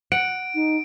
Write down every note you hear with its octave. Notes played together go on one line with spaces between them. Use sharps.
F#5 D7
D#4